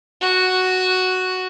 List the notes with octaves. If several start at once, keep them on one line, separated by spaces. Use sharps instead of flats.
F#4